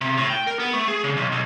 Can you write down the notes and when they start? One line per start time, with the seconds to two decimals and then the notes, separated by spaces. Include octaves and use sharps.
0.01 C3
0.17 A2
0.30 G5
0.47 A#4
0.59 B3
0.73 A3
0.88 G#4
1.04 C#3
1.17 B1
1.32 B1